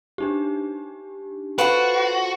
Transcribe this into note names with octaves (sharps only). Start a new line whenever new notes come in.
D4 D#4 G4
F4 F#4 A4 B4 C5 F#5 C#6 D7